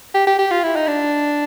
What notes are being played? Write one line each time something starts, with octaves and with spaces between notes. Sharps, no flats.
G4
G4
G4
F4
E4
D#4
D4